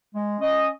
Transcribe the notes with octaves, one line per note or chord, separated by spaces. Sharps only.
G#3
C#4 D#5